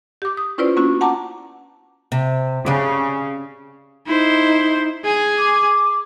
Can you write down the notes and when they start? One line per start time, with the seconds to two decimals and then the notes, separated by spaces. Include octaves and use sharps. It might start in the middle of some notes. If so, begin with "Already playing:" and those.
0.22 G4 D6
0.37 D#6
0.58 C#4 E4 F4 B4 C5 D5
0.77 A#3 B3 C#4 D4 E4 F#4
1.01 F#5 A5 A#5 D6
2.12 C3
2.66 C#3 D4 G4
4.07 D#4 E4 C5
5.05 G#4 G#5
5.38 D6